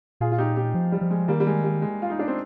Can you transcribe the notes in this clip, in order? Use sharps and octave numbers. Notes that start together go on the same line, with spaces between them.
A#2 F4 G#4
F4
D#4 G4
D#4 G4
F3
G3
F3
G#3
D#3 G3 A#3
G3
G#3
G3
G#3
F4
D#4
D4
C4